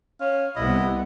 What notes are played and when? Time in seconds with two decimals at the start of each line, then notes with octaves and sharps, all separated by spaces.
0.20 C#4 F5
0.56 C2 B3 E4 D#5